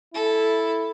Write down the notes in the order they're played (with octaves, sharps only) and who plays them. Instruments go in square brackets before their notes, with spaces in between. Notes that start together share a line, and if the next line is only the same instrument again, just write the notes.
[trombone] E4 [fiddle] A4